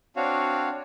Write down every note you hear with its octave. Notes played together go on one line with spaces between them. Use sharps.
C4 D4 F#4 C#5 F5